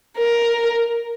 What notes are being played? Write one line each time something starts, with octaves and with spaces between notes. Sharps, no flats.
A#4